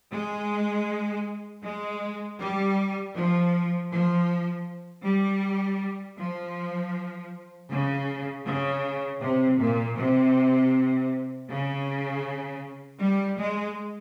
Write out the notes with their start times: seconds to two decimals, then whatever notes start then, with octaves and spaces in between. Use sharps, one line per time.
0.11 G#3
1.62 G#3
2.38 G3
3.15 F3
3.91 F3
5.04 G3
6.17 F3
7.69 C#3
8.45 C#3
9.21 C3
9.58 A#2
9.97 C3
11.49 C#3
13.01 G3
13.38 G#3